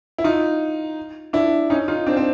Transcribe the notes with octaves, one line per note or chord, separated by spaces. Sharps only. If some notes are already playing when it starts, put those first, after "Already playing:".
E4
D#4 F4
D4 E4
C#4 D#4
D#4 F4
C4 D4
C4